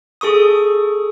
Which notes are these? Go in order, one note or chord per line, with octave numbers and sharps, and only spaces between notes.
G#4 A4 C#6 D#6